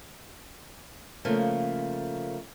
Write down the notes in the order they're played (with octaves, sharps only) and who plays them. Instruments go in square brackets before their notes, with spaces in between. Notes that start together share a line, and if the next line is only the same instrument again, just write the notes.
[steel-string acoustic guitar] C#3 F3 A3 A#3